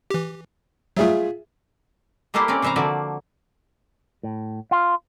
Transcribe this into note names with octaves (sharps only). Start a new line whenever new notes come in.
E3 G4
F#3 G3 A3 F4 G#4 E5
G3 A3 A#3 E4 G4 C5
C4 C#4 A#4 D5
C3 E3 E5 F5 A#5
D3 F3 A#3 F#4 D5 E5
A2
F4